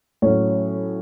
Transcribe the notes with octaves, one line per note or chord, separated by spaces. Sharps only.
A2 F#3 C#4